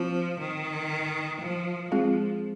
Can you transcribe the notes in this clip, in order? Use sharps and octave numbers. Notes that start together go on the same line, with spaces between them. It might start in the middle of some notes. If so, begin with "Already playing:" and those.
Already playing: F3 C4 F4 C5
D#3
F3
F3 G#3 C4 F4 G#4